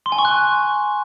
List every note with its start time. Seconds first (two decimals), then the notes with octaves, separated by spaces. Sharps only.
0.06 C6
0.12 G#5
0.18 C#6
0.25 F#6